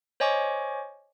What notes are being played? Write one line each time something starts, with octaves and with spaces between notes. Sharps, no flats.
C5 C#5 D#5 G#5 C#6 D6